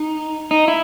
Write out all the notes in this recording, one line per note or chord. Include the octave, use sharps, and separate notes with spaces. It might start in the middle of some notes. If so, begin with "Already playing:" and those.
Already playing: D#4
D#4
E4